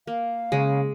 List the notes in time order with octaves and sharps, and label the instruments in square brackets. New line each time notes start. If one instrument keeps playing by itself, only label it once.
[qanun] A#3 [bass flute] F5
[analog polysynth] C#3 [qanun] G#3